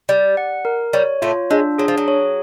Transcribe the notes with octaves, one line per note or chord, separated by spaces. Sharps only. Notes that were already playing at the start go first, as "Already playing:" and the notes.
G3 D5
F#5
A#4
G3 C#5
A2 A3 F4
G#3 D4
F#3 G#4
F3
F#3
C#5